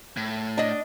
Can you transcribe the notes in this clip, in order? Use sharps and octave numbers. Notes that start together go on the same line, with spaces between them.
A2
D4 D#5